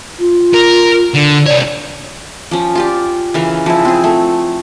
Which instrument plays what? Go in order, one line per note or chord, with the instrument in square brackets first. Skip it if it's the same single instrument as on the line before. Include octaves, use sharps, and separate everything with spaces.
[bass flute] F4
[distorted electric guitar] A#4
D3
[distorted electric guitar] C2 C#5 [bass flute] D5
[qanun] F3 C#4
F4 G4 D5
C#3 E3 A#4
F3 E4
C4 G#4
A3